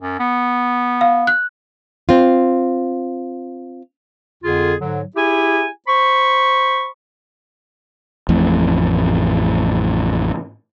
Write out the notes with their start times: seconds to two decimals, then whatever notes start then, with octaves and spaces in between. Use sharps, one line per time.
0.02 F#2
0.19 B3
1.01 F5
1.27 F#6
2.09 C4 F4
4.44 F2 D3 F4 G#4
4.81 G#2 D3 F#3
5.16 E4 G4 G#4 G#5
5.88 C5 B5 C#6
8.29 A1 F2 A2